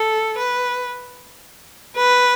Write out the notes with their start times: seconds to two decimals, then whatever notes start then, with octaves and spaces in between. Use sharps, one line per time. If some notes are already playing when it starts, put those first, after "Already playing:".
Already playing: A4
0.38 B4
1.96 B4